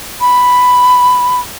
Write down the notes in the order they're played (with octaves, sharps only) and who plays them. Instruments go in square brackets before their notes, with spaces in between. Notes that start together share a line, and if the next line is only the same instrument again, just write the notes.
[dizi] B5